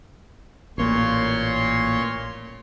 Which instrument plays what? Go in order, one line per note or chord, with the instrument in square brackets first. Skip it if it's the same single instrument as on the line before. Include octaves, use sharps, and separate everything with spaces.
[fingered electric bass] A1 A#3 [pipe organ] A#2 C#5 C6